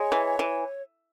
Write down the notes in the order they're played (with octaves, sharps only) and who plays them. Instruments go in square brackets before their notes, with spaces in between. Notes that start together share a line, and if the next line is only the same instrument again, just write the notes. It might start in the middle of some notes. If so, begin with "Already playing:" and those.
Already playing: [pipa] G#3 [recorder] C#5
[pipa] E3
E3